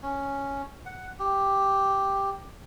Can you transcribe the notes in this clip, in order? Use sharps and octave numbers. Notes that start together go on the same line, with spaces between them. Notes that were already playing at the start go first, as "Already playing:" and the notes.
C#4
F#5
G4